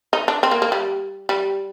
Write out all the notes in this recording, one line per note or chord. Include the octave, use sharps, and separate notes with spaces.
D#4
D4
C4
A#3
A#3
G3
G3